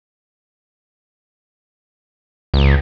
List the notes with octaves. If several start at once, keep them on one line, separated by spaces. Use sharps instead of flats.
C#2